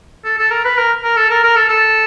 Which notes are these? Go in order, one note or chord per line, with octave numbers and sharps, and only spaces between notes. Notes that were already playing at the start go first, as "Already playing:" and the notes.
A4
A4
A#4
B4
A#4
A#4
A4
A#4
A#4
A4
A4